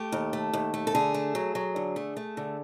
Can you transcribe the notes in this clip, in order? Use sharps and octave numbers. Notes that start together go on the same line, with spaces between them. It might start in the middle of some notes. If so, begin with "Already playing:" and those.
Already playing: A3 G4
D#2
A3
D#2
A3
A4
D3 G#4
A3
F#3
F#3
D3
A3
A3
D3